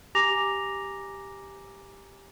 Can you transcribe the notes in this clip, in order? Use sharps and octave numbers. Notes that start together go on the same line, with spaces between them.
G4 G#5 A#5 D6 A#6 F7